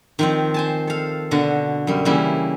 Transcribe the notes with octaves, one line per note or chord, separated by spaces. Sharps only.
D#3 F3 C4
C5 G#5 A5
A4 F5
B2 D3 F#4
F#2 G3
C#3 E3 G3 A#3 E4